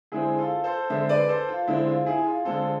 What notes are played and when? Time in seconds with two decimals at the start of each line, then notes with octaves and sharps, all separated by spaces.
0.12 D3 G#3 C4 E4 G#4
0.38 F4 A4
0.64 A4 C5
0.90 D3 G#3 C4 C5 E5
1.09 B4 D5
1.29 A4 C5
1.49 F4
1.67 D3 G#3 C4 E4
1.87 F4
2.06 E4 G#4
2.26 F4
2.45 D3 G#3 C4 F4 A4